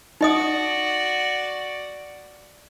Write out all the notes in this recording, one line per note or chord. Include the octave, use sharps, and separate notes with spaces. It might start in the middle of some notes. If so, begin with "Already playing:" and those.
D#4 F#4 D5 D#5 D#6